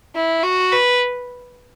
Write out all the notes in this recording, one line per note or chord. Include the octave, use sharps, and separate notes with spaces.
E4
F#4
B4